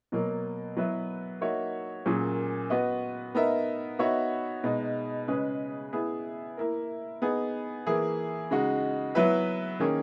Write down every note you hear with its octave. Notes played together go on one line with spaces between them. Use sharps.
B2 F#3 A#3
F#3 B3 E4 B4 E5
A#3 D#4 F#4 C#5 E5
A#2 F#3 C#4 G#4
B3 F#4 B4 D#5
B3 D#4 A#4 E5
B3 D#4 F#4 C#5 E5
B2 G#3 D#4
C#3 G#3 C#4 G#4 B4
B3 E4 G#4
A#3 E4 A#4
B3 D#4 G#4
E3 A#3 E4 G#4
C#3 G#3 D#4 F#4
F#3 B3 E4 B4 E5
D#3 A#3 C#4 G#4